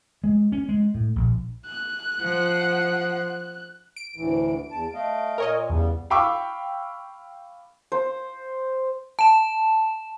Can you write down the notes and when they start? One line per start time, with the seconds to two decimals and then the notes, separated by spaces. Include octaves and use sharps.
0.24 G#3
0.52 C#4
0.69 G#3
0.94 A2
1.16 A#1
1.66 F#6
2.21 F3 F#5
3.96 D7
4.16 D2 A2 E3
4.71 E2 A5
4.94 A3 D#5 F5
5.38 A#2 A#4 C#5 D#5 G#5
5.70 E2 C#3 G3 B3
6.10 F5 G5 B5 C#6 D6 E6
7.92 C5
9.19 A5 E7